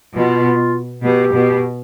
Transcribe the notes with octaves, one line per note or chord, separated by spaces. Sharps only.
B2 F4
B2 G4
B2